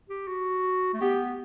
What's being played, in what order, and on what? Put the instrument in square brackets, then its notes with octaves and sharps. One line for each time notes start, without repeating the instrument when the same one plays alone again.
[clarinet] G4
F#4
A3
[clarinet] B3 [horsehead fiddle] G4